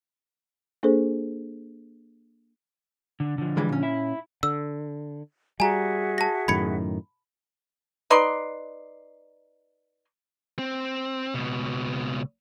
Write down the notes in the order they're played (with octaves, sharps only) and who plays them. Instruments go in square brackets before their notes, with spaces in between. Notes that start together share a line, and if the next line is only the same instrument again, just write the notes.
[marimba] A#3 D4 G#4 A4 C5
[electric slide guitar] D3
D3 F3
[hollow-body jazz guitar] E3 G3 G#3
A#2 C#4
[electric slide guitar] E4
[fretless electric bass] D3 [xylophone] E6
[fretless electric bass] G3 [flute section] F#4 G#4 E5 [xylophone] G#5 A#5
[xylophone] A5 A#6
[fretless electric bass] F#2 A2 D#3 [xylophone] B5 G#6 C#7
[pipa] D#4 B4 D5 C6
[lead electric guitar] C4
C#2 B2